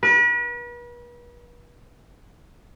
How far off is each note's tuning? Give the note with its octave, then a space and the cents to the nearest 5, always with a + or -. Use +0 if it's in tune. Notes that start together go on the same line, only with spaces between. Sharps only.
B4 -40